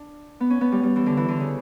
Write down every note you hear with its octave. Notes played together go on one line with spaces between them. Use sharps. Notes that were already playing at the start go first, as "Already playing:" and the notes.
Already playing: D4
B3
C#4
B3
G3
G3
E3
D3
E3
D3
C#3